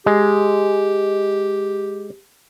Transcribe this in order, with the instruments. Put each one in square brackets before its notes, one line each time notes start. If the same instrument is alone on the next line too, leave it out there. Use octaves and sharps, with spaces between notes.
[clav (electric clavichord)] G#3 [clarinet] G4